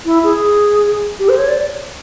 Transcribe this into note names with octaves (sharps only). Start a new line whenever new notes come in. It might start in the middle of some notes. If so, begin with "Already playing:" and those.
E4
G#4
G4
C5
C#5
D5